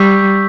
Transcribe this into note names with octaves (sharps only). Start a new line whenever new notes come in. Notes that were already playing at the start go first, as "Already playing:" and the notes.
Already playing: G3 C#6 E6 G6 B6